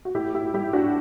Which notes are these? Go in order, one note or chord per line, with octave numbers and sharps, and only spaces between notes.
F#4
A2 E4 G4
E4 G4
G3 E4 G4
D4 F#4